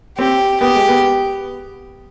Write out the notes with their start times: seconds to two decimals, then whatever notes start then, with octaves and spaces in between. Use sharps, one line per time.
0.18 C4 G4
0.60 B3 G4
0.75 G#3
0.89 B3